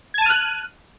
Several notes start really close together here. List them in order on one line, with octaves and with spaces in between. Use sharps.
G#6 A5 D#7 F6 F#6